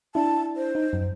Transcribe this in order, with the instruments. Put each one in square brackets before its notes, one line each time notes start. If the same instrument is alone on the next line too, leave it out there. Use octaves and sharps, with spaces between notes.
[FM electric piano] D4 E4 [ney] A5
[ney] C5
[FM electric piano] D#4
F#2